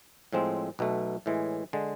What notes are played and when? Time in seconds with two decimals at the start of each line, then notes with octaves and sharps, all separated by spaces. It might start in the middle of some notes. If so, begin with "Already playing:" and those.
0.33 A2 F3 G#3 C4
0.79 B1 B2 A3
1.26 A2 E3 G#3
1.73 D3 G#3